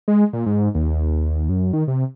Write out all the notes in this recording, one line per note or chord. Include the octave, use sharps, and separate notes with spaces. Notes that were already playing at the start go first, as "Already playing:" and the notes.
G#3
A#2
G#2
D#2
F#2
D#3
C3